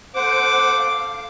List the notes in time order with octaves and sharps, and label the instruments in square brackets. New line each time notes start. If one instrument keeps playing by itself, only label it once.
[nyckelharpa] A4 D6 [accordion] C5 F#5
[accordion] F5